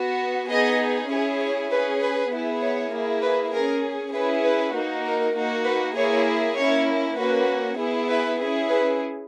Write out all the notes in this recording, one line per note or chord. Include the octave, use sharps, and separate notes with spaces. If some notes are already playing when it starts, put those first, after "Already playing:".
Already playing: B3 F#4
B3 D#4 G#4 D#5
C#4 E4 G#4 C#5
C#5
C#4 G#4 B4
B4
B3 E4 G#4
C#5
A#3 E4 G#4
B4
C#4 G#4 A#4
C#4 E4 G#4 B4
B4
A#3 D#4 F#4
A#4
A#3 D#4 F#4
B4
A#3 E4 G#4 C#5
A#3 C#4 E4 C#5
A#3 C#4 F#4 B4
B3 E4 G#4
B4
C#4 E4 G#4
B4